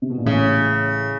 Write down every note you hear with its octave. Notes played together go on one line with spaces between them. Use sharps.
C3
B2
A#2
A1 A2 C#3